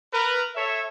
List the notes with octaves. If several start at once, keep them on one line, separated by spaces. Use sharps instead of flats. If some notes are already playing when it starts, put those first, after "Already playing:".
A#4 B4
A4 C#5 E5